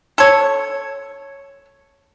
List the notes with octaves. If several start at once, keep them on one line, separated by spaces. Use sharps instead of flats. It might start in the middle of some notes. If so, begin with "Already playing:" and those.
A4 C#5